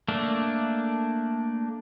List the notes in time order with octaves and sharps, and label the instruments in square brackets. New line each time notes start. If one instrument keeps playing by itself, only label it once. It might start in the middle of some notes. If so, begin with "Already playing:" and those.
[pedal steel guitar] A3 A#3 D4